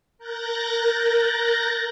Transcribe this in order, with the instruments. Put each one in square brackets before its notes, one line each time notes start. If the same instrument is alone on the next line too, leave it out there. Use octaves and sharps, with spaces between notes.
[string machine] A#4 F#6 G6 A6 A#6